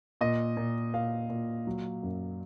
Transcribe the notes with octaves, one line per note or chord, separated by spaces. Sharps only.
A#2 D#5
A#2
A#2 F5
A#2
F#3
F#2